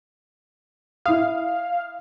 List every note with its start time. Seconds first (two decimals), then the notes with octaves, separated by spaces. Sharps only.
1.06 E4 F5 D#6